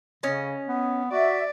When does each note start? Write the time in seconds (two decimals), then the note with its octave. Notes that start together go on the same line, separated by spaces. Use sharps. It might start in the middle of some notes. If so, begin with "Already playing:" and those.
0.23 C#3 C#4 D#5
0.68 B3
1.12 F#4 D5 E5